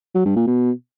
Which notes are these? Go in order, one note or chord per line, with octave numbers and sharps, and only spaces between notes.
F#3
G2
A#2
B2